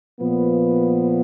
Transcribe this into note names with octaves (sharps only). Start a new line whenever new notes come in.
A#2 F3 B3